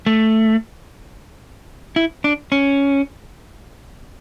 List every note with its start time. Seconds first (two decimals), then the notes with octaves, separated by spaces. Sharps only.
0.06 A3
1.96 E4
2.24 D4
2.52 C#4